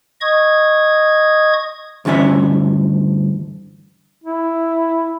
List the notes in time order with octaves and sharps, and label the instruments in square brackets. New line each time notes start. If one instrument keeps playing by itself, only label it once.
[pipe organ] D#5 C#6 D#6 G#6
[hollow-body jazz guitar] D2 G2 E3 C#4 E5
[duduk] E4